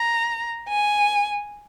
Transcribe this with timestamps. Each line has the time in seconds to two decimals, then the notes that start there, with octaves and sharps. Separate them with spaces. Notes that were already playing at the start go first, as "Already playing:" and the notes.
Already playing: A#5
0.69 G#5